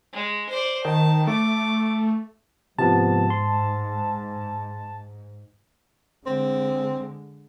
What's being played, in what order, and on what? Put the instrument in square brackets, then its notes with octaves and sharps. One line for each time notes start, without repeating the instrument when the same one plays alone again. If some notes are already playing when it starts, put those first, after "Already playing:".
[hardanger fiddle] G#3
C5 D5
[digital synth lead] D#3 [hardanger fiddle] A5
[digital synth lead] A3 [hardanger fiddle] D6
[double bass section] G#2 [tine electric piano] C3 F3 B3 [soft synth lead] A5
[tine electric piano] C6
[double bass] D3 G#3 [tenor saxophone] C4